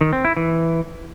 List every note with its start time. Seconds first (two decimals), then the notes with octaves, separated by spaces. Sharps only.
0.01 D#3
0.13 C4
0.25 E4
0.37 E3